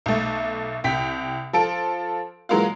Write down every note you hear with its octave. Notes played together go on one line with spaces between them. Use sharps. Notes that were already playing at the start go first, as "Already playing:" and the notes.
B1 A3
C2 G5 B6
F3 F4 A4 D7
E3 F#3 G#3 A#3 F4